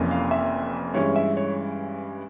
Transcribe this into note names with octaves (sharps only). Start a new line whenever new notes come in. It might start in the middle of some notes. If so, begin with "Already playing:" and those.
Already playing: F1 F2 E3 A#3 C#4
F5
E5
G2 E3 G#3 C#4 C#5
E5
C#5